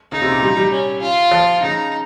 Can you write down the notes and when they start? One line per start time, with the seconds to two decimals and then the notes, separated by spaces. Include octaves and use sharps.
0.12 C#3 D#4
0.22 C3
0.32 A#2
0.43 G3
0.57 G3
0.72 C#4
1.02 F4
1.31 F3
1.63 C#3 D#4